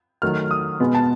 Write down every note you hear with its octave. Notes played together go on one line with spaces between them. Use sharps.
D#3 F#3 A3 F6
D#6
B2 G#3 B3
A5